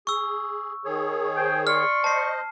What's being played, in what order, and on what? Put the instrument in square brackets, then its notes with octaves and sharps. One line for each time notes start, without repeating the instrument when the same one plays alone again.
[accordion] G#4 [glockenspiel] C#6 E6
[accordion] D#3 G#4 C#5
[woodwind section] C5 G5 G#5
[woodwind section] D5 C6 C#6 [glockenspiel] F6
[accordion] C5 D#5 [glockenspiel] A5 C7